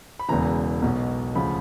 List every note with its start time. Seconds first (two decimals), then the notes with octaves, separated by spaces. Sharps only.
0.19 B5
0.29 E1 E2 C#3 E3 A#5
0.82 B1 B2
1.35 D2 C#3 F3 B5